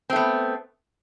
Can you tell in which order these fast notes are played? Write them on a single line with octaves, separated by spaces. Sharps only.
C4 A3 B3